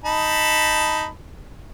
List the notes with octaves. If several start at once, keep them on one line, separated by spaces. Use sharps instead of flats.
D#4 A5 B5